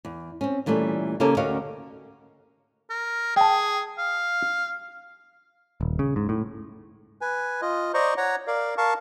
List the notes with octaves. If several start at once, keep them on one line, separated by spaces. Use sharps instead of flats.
E2
C4 C#4
A#2 E3 G3 A3 C#4
C#3 A#3 C#4 G4 A4 A5
D2 C#4 F#4 A#4 D#5 F5
A#4
G#4 G5 A5
F5
D#1
C#3
G#2
A2
B4 G#5
F4 D#5
C5 D5 D#5 A#5 C#6
C#5 F#5 A#5
A#4 D5 F5
A#4 F5 A5 C#6